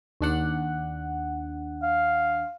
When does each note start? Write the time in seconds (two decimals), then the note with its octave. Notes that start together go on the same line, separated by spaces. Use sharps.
0.21 D#2 D4 F#5
1.83 F5